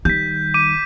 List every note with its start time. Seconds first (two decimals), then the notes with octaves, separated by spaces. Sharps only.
0.05 D#3 G3 G6 B6
0.54 D6 D#7